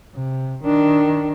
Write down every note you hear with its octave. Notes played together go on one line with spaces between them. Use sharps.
C3
D#3 D4